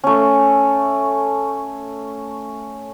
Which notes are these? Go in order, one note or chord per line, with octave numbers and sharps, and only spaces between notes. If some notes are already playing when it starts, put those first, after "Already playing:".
A3 C#4